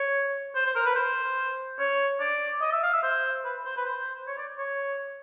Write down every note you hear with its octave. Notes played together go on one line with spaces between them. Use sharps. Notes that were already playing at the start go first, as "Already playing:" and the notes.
Already playing: C#5
C5
C5
A#4
B4
C5
C#5
D5
D#5
E5
F5
E5
C5
B4
C5
B4
C5
C#5
D5
C#5